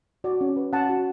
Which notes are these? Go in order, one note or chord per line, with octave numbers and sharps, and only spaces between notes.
F#4 D5
C#4
B4
C#4 F#5 A5
F#4